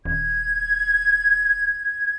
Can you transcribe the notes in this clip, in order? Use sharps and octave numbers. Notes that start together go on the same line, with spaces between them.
D#1 G#6